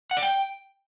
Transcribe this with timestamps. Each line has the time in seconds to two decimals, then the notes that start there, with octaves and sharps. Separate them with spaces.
0.11 F#5
0.17 D5
0.22 G5